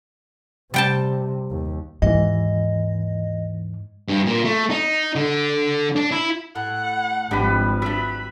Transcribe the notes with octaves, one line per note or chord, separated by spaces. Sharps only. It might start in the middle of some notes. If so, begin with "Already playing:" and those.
C3 G3 G5 A5
D#2
D#2 G#2 E3 D#5
G2
A#2
A3
D#4
D3
D4
E4
A2 F#5
G#1 F3 G3 G#3 D4 G4 B4
F#3 D4 E5 B5